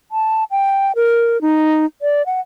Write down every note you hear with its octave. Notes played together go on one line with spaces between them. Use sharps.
A5
G5
A#4
D#4
D5
F#5